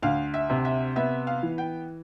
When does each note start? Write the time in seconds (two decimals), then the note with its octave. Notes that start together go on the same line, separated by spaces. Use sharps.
0.02 D2 F5
0.34 E5
0.50 C3
0.65 E5
0.96 B3 E5
1.27 F5
1.43 E3
1.58 G5